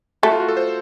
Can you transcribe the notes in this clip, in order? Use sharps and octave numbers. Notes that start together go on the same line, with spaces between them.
A3 F#4
F4
F#4
A4
C5